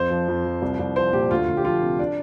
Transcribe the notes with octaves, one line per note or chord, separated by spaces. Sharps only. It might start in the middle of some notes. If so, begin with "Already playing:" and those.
Already playing: F2 C5
F3
F2
F3
C2
C2
F3 C5
A#2 G4
D2 F4
D2
G4
F3 F4
C3
D4